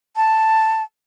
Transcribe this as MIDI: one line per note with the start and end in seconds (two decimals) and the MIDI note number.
0.16 0.83 81